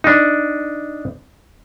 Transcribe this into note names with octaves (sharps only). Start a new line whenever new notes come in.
D4 D#4